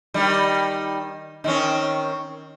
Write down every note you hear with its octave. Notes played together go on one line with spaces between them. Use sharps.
D#3 G3
D#3 C4 C#4